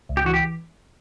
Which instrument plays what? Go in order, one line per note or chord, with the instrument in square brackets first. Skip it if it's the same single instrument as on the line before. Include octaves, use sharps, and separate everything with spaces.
[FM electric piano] C#2
[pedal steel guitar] G4
[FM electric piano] E3 [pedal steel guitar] F#4
[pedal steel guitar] G4